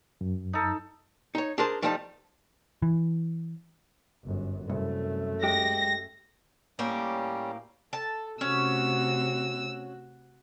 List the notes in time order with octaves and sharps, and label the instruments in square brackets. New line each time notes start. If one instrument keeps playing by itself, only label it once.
[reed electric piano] F#2
[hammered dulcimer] D#4 A4
[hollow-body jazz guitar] D#4 C#5
D4 G#4 A#4 C5 A5
F3 G3 A3 D#4 F#5 A5
[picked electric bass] E3
[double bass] G1 F#2
[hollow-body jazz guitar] C2 [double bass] F#2 A3
[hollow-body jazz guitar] G#3 G4 [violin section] A#6
[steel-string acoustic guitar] A2 A#3 G4 [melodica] G3 C#4
[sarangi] A4 [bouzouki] A5
[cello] C3 A3 [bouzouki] C#4 [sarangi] F#4 [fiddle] E6